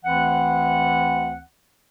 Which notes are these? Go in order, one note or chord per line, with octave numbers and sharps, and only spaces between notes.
D2 E3 C4 F#5